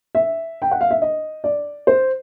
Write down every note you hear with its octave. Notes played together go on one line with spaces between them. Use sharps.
E5
G5
F#5
F5
E5
D#5
D5
C5